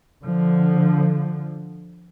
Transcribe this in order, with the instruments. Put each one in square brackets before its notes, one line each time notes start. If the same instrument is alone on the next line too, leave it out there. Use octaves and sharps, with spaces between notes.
[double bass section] D3 F3